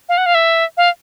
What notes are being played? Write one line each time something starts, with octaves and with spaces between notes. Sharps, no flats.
F5
F#5
F5
E5
F5